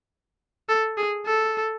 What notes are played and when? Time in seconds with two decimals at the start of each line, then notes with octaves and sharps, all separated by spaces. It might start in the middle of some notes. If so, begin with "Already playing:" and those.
0.69 A4
0.97 G#4
1.26 A4